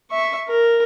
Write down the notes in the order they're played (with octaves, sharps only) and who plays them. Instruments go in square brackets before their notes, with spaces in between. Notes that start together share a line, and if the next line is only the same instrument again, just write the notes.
[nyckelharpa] E5 C#6
A#4